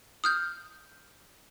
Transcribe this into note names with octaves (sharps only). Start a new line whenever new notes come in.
D#6 F6 G6